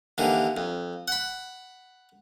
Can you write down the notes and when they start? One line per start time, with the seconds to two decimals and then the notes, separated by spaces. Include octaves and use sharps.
0.18 D#2 D3 E3
0.57 F2
1.08 F#5 B5